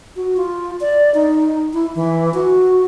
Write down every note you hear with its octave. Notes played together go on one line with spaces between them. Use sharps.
F#4
F4
D5
D#4
E4
E3
F#4